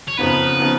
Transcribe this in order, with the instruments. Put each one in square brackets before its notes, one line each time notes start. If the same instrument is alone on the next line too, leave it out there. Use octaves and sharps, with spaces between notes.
[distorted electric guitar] C#5
[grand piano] F2 C#3 F3 B3 D#4 [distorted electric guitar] B4
[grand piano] C#3 F3 B3 D#4